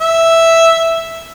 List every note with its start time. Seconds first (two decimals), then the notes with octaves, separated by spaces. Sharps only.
0.01 E5